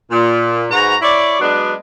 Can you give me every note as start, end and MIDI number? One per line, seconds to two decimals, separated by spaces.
0.11 0.66 46
0.71 0.95 44
0.71 0.95 66
0.71 0.95 71
0.71 0.95 82
1.02 1.37 64
1.02 1.37 73
1.02 1.37 74
1.40 1.73 54
1.40 1.73 56
1.40 1.73 59
1.40 1.73 62